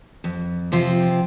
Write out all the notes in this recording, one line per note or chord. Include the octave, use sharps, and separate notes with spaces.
F2
C3 F3 C4 F4